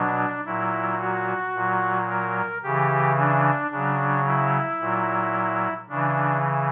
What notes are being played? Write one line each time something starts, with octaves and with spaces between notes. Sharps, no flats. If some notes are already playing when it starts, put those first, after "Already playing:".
Already playing: B2 F#3 D4
A#2 F#3 E4
F#4
A#2 F#3
A#4
C#3 E3 G4
D4
C#3 F#3 D4
E4
A#2 F#3
C#3 E3 D4